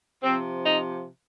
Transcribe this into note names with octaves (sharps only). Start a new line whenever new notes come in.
C3 F3 C4
D#4